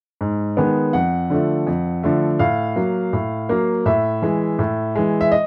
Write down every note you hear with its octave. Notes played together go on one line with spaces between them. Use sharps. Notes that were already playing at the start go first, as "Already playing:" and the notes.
G#2
D#3 G#3 B3
F2 F#5
D3 F3 A3
F2
D3 F3 A3
A2 F5
F#3 A#3
A2
F#3 A#3
A2 E5
E3 G#3
A2
E3 G#3
E5
D#5